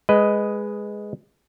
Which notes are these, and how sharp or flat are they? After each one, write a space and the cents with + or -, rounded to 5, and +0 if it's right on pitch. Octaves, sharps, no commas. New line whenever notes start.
G#3 +0 B4 +10 D#5 +0